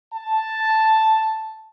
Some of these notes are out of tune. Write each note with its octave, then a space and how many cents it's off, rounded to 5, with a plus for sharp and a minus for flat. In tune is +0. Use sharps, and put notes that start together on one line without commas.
A5 +0